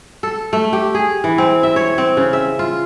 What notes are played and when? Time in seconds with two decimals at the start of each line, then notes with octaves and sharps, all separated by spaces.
0.23 A4
0.53 A3
0.73 G4
0.95 G#4
1.24 E3
1.38 C4
1.63 E5
1.76 C#5
1.98 C4
2.17 C#3
2.33 E5
2.59 F4